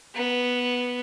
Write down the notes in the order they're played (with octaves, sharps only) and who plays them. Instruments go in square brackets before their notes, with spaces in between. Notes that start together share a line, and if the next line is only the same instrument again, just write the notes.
[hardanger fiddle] B3